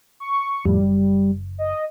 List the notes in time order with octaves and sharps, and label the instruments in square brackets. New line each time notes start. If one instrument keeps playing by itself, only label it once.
[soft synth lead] C#6
[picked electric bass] F2 A2 [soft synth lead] G3
[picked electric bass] F#1
[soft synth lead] D#5